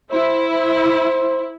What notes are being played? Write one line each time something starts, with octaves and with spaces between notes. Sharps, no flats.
E4 C5
C5